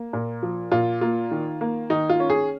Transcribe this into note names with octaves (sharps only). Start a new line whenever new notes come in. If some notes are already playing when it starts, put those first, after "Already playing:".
Already playing: A#3
A#2
F3
A#2 F4
A#3 F4
D#3
A#3
D#3 D#4
F4
C#4
G#4